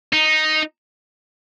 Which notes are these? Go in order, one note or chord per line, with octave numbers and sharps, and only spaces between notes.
D#4